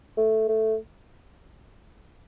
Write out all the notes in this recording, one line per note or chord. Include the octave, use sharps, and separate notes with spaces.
A3
A3